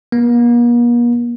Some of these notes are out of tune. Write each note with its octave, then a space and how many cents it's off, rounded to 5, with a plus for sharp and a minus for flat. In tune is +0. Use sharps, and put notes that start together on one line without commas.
A#3 +45